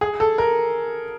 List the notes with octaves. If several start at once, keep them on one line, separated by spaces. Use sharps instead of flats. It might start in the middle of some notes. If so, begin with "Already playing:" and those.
G#4
A4
A#4